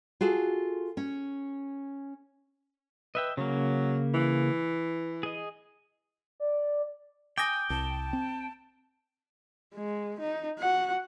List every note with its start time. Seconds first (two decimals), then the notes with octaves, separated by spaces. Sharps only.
0.21 F4 F#4 G#4 A4
0.97 C#4
3.15 B4 D#5 E5 G5
3.37 C#3 F#3 A#3
4.14 E3
5.23 G#4 D#5
6.40 D5
7.38 G5 G#5 D6 D#6 A#6
7.70 C2 A5
8.13 C4
9.74 G#3
10.20 D#4
10.59 F#4 F#5